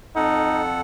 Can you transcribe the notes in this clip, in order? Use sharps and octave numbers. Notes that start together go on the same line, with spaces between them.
F2 D#4 A4 F#5